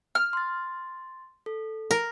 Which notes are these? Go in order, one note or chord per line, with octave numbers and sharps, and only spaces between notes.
F6
C6 A6
A4
A#4